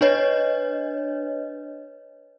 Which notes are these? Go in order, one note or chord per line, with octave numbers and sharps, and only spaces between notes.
D4 B4 C#5 D#5